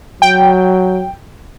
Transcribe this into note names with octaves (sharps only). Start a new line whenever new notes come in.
F#3 G5